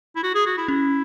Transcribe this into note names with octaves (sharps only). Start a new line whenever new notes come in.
E4
F#4
G#4
F#4
E4
C#4 E4